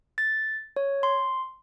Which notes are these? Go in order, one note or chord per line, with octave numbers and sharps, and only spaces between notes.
A6
C#5
C6